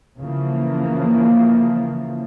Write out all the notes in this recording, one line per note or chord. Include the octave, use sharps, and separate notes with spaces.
C#3 E3 F3 A#3